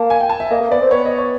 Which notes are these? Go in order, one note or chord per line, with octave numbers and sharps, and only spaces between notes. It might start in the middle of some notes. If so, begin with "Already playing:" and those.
Already playing: A#3 A5
G#5
G5
A5
E5
A#3 D#5
A#3
B3 D5
C4
B3 C#5
D#5
C#5